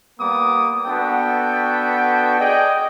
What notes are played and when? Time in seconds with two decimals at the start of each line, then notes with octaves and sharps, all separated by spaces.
0.19 G3 A#3 B3 D6 D#6
0.86 B3 D4 F#4 A4 G5
2.39 G#4 D5 D#5 G5